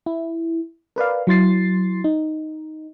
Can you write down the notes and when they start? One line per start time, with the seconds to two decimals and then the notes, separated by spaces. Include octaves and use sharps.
0.06 E4
0.96 A#4 B4 D5 F5
1.27 F#3 E4 C6 A6 C7
2.04 D#4